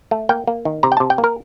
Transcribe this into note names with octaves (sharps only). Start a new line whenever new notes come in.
A3
A#3 G5
A#3
D#3
C3 A#5
G5
C3 A5
G5
A#3
A#4